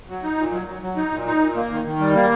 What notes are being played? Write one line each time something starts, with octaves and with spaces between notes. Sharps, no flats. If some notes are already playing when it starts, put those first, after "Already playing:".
F#3
D#4
A#2
F#3
F#3
F#3
D#4
A#2
D#4
A#2
A#3
D#3
D#3
G3
A#3